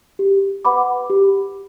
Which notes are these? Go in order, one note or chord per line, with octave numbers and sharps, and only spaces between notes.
G4
B4 F#5 B5 D6
G4